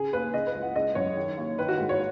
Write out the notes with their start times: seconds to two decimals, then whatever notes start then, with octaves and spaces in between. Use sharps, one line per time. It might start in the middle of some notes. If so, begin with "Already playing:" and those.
Already playing: C#3 G#4
0.13 D#2 B4
0.33 C#3 D#5
0.47 B4
0.55 C#2
0.62 F#5
0.75 C#3 D#5
0.95 F#2 C#5
1.16 D#3
1.37 D#2
1.58 D#3 B4
1.68 F#4
1.78 G#2
1.89 C#5